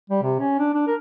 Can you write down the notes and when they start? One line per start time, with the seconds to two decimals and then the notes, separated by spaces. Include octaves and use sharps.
0.10 G3
0.23 C3
0.40 C#4
0.59 D4
0.74 D4
0.88 A#4